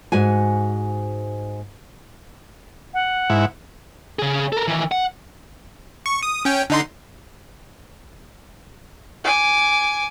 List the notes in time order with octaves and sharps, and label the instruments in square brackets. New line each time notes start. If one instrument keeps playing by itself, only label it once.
[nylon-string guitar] G#2 F#4 G#5
[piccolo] F#5
[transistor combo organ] G#2 E4
[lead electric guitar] C#3 G#4
A4 A#4
D#3 E3
F#5
[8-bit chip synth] C#6
D#6
C#4 G5
D3 D#4 C6
[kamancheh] G#5 D6